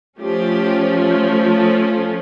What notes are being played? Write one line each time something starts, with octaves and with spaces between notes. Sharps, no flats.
F3 A3 C#4 G4
A4